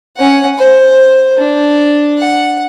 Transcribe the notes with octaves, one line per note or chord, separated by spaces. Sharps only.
C#4 F#5
C5
D4
F#5